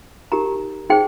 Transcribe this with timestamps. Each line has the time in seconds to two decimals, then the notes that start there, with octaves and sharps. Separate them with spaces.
0.32 D#4 G4 A#4 A#5
0.90 D#4 G#4 C5 G5